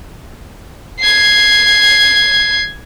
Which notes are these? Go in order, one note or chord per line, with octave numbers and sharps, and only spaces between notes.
G#6 C7